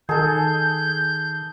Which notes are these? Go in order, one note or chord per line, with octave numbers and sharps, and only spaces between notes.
D#3 G#4 A4 G6